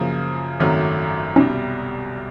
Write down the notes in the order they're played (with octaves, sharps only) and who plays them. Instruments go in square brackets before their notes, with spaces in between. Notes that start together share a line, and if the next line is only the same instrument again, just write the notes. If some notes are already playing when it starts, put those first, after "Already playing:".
Already playing: [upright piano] F#2 C#3 F3 A#3
G#1 F#2 D#3 F#3 A3
[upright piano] C2 B2 G3 [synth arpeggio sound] C#4 D#4